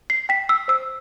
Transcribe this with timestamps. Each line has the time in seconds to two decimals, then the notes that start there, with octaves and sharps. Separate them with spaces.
0.10 C7
0.29 G5 B6
0.49 E6
0.68 C5 E6